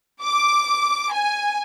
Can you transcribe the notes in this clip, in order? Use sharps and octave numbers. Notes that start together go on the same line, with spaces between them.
D6
G#5